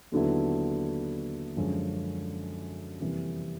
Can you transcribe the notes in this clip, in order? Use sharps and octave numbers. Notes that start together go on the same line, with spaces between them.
D#2 D3 F#3 B3 E4
F#2 D3 F3 G#3 C#4
F2 C3 E3 G3 A#3